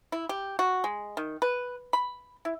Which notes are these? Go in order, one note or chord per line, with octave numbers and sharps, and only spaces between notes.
E4
G4
F#4
G#3
D#3
B4
B5
E4